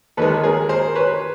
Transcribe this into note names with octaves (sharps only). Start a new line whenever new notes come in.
D#2 D#3 G#3 A4 B4
G#4 A#4
A#4 C5
B4 C#5